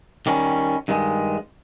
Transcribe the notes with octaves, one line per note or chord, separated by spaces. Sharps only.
D#3 G3 C#4
G2 D#3 G#3